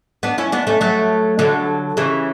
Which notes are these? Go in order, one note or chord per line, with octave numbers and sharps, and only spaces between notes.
B3 D4
C#4 E4
B3 D4
A3 C#4
F#3 A3
D3 F#3
C#3 E3